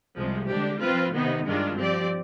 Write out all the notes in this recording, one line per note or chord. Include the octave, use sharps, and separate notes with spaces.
C2 C3 F3 G#3
D3 G#3 D4 G4
F3 C4 F4 B4
C3 D#3 B3 D#4
G2 D#3 G#3 D4 F4
F3 C4 G4 D5